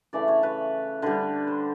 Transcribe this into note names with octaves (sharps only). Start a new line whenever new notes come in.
C#3 E3 A3 D5
C#5
B4
D3 G3 B4
C5